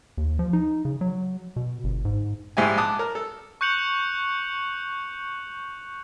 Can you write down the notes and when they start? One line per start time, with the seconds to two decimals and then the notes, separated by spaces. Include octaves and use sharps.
0.17 D#2
0.39 F3
0.53 D#4
0.85 C#3
1.01 F#3
1.56 B2
1.84 G1
2.05 G#2
2.57 A#1 G#2 G#3 E4 G4 G#5
2.78 A5 D6 D#6 F#6
2.99 A#4
3.15 A4
3.61 C#6 F#6 G6 C#7 F7 F#7